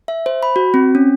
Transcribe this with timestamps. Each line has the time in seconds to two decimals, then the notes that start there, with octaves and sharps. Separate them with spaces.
0.08 E5
0.26 C5
0.43 B5
0.56 F#4
0.74 C4
0.95 C#4